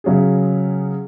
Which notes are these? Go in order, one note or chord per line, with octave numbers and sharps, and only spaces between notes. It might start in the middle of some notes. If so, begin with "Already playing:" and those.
C#3 F#3 C#4 G#4